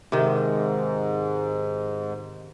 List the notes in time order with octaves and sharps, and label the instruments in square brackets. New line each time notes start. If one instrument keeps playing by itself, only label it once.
[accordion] G#2 [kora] C3 D#3